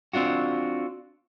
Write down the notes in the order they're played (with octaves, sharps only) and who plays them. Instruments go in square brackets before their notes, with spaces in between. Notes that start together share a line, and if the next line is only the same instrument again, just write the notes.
[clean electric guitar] C4 D4 F4 F#4